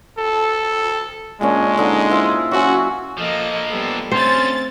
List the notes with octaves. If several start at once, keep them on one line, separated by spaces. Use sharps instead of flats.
A4
A#2 G#3 C#4 D4
D3 D#4 C5
E4 F4 C5
F#3 C#4 F#4
F3 A#3 A4 D#5
G3 B3 A4
D2 A3 C4 C#4 C5 A6